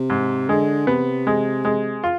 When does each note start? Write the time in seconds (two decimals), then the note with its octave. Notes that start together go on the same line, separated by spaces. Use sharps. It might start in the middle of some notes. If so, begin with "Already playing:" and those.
Already playing: C3
0.10 G#2
0.49 D3 G#3
0.87 C3 B3
1.27 G#3
1.65 G#3
2.04 F4